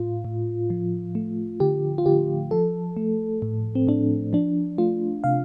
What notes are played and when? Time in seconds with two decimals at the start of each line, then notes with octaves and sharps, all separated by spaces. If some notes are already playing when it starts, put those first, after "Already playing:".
Already playing: A2 F4
0.25 A2
0.70 F3
1.15 A3
1.60 D3 G4
1.98 F4
2.06 D3 G4
2.51 F3 A4
2.97 A3
3.42 A2
3.75 C4
3.87 A2 D4
4.33 F3 D4
4.78 A3 F4
5.24 C3 F5